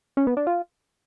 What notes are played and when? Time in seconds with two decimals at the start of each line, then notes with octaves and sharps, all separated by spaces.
0.17 C#4
0.27 B3
0.37 D4
0.47 F4